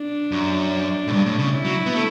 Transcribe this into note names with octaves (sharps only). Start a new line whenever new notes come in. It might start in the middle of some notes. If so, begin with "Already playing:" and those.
Already playing: D4
F#2
A2
G2
A2
C#3
E4
F#3
B3
A3